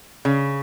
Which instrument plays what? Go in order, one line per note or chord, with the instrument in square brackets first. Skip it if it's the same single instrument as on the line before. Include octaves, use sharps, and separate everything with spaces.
[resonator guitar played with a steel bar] C#3